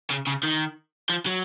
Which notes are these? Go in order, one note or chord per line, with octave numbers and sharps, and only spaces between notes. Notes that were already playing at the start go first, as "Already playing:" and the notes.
C#3
C#3
D#3
F3
F#3